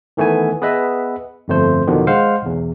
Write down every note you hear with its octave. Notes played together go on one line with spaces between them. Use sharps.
D#3 E3 A3 B3 G#5
B3 G#4 B4 D#5 E5
G1 F2 A3 C5
E2 B2 D3 D#3 F3
G#3 C5 F5 F#5
B1 E2